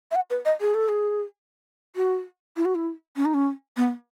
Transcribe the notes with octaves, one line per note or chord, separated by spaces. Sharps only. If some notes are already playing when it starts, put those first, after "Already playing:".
E5
F#5
B4
D#5
G#4
A4
G#4
F#4
E4
F#4
E4
C#4
D#4
C#4
B3